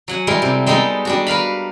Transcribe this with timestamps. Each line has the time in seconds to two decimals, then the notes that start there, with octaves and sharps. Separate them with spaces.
0.08 F#3 F#5 G#5
0.27 G3 G#3 E4 A#4
0.42 C3
0.66 G3 G#3 B3 D#4 A4
1.05 G3 D4 F#4
1.27 A#4 B4 F5 B5